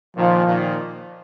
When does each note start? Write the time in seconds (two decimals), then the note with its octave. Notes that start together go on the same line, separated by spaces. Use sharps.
0.16 A#2 D#3 F3
0.47 A#2 D#3